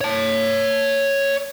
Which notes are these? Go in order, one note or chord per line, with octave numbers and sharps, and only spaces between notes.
C#5 A5